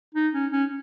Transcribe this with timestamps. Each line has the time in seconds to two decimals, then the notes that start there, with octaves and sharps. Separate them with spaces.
0.15 D#4
0.34 C#4
0.52 C#4